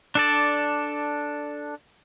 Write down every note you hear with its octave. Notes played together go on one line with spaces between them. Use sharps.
D4 A4 D5